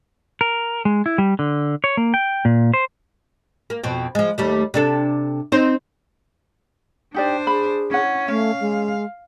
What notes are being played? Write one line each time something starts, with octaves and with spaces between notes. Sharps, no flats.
A#4
G#3
E4
G3
D3
C#5
A#3
G5
A#2
C5
A#3
F2 B2 C4
F3 G#3
D#2 G3 A3
C3 D4 A4
C4 D#4 C5
D4 D#4 G4 C5 D5
G#4 B5
C#4 E4 F#5
A3 C#4 F5
G#3